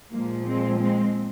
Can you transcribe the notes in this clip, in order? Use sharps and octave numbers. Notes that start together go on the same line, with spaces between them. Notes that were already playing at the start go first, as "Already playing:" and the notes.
A#2 F3 G#3 A#3
G#3 C4
G#3 C4